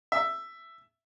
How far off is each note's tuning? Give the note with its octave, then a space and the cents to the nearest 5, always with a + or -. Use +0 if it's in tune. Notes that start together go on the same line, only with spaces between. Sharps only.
E5 +10